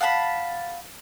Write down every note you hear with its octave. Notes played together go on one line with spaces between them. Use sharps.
F5 F#5 A5 B5